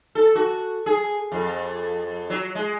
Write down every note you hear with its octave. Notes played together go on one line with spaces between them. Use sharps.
A4
F#4
G#4
F2
F#3
G#3